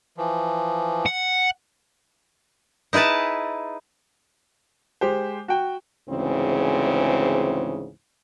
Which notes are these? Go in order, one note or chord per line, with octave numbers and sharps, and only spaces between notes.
E3 F3
F#5
D#4 E4 G#4 B4 A5
G#3 G4 C5
F#4 G5
D2 G#2 C#3 E3 C4